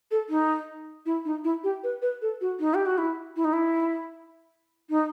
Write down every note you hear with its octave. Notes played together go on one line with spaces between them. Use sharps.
A4
D#4
E4
D#4
E4
G4
B4
B4
A4
F#4
D#4
G4
F#4
E4
E4
D#4
E4
D#4